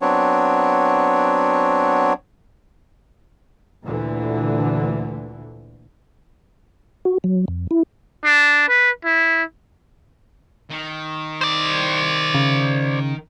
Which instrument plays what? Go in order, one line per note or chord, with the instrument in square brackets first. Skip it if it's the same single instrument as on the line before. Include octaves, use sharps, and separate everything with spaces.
[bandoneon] F#3 B3 C4 D4 C#5
[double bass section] D2 A#2 D3 E3
[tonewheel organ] F#4
F#3
F2
E4
[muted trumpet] D4
B4
E4
[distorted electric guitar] D#3
[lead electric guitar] C5 D5
[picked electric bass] C#3